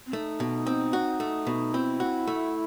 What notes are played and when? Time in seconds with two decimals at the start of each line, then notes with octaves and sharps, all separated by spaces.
0.06 C4
0.13 A3 D#4
0.40 B2
0.67 C4
0.93 F#4
1.20 A3
1.47 B2
1.74 C4 E4
2.00 F#4
2.27 A3